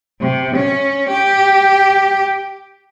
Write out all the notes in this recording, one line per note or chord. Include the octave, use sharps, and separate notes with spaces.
C3
C#4
G4